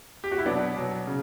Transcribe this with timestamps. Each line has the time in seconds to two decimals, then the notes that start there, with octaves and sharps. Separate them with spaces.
0.24 G4
0.31 F#4
0.38 E4
0.45 B2 F#3 B3 D4
0.76 B2 F#3
1.07 C#3